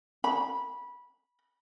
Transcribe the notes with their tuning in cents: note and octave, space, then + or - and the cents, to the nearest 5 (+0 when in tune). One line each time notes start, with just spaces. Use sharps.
B5 -15